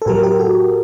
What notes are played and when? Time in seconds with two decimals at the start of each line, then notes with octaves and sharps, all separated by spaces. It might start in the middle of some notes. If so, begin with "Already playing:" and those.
0.02 A4
0.06 A2 F#3 G4 A#4
0.23 G4 A#4
0.39 F#4 A4